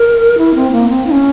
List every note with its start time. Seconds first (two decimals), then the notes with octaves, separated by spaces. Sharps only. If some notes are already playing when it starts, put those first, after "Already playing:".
Already playing: A#4
0.38 E4
0.55 C4
0.72 A#3
0.89 C4
1.07 E4
1.11 C#4